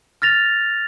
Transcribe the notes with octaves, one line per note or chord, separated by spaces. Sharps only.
F6 A6 A#6 F7